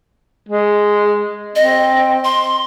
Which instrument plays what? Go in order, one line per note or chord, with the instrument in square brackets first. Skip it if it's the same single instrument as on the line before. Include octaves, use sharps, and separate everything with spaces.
[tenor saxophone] G#3
[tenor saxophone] C4 [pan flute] D#5
[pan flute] C6